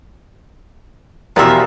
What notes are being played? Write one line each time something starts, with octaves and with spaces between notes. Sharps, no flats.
E2 B2 F3 G3 A#4 E5